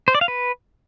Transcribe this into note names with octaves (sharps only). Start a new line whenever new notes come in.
C5
D5
F5
B4